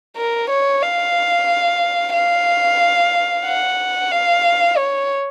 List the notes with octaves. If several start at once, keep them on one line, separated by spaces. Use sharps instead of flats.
A#4
C#5
F5
F5
F#5
F5
C#5